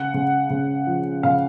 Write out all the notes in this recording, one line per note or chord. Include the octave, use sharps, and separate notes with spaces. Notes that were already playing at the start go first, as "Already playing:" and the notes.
Already playing: C#3 F#5
C#3
C#3
F3
C#3 F5